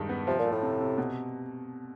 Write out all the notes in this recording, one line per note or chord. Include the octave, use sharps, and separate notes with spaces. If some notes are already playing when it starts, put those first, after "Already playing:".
Already playing: G2 D#3 G#3
B3
C3 F3
A#2
A3
A2
C3
C3
B2